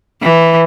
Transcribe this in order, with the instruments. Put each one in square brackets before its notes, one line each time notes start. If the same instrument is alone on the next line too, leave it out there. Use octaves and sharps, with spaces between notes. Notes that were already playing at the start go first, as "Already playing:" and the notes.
[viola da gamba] E3